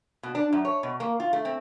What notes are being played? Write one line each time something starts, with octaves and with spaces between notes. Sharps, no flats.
B2
D4
F#2
C#5
B2
A#3
F4
A3
C4